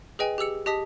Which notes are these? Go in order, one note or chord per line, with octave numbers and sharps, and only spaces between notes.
G#4 B4 D#5 G5 G#5
G4 G#4 E6 C#7
G4 D#5 A5 D#6 B6